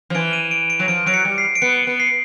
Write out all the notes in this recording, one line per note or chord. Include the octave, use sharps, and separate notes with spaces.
F3
E3 D7
D#7
D7
D7
F#3
F3 D7
F#3 D7
C#7
G3
C7
D7
B3 C#7
B3
C7